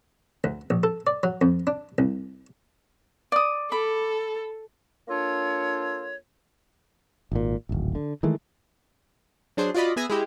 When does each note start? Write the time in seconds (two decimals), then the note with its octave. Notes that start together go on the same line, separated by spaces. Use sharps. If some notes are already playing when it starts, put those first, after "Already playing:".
0.44 D2
0.70 A#1
0.83 A4
1.07 D5
1.23 F#3
1.41 F2
1.67 D4
1.98 C2
3.32 D5 D#6
3.72 A4 B5 D6
5.08 A#3 D4 F4 A4 C#5
7.32 G#1 A#2
7.69 D1 G#1
7.95 D3
8.23 D#3 E3 G#3 A3
9.57 F#3 D4 G#4 C5
9.74 F4 F#4 D5 D#5 B5
9.96 B3 G#4 E5 G#5 A#6
10.10 G#3 E4 G4